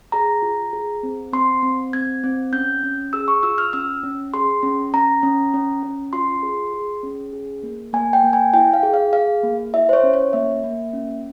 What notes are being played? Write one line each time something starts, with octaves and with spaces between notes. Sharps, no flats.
G#4 A#5
F4
G#4
C4
C4 C6
C4
C4 G#6
C4
C#4 G6
C#4
G#4 E6
C#6
F4 E6
F6
C#4 E6
C#4
G#4 C6
C#4
C#4 A#5
C#4
C#4
C#4
F4 C6
G#4
G#4
C#4
G#4
A#3
A#3 G#5
G5
A#3
G#5
E4 G5
F5
G#4
F5
G#4 F5
A#3
E4 E5
C5
C#5
C#4
C#5
A#3 E5
A#3
C#4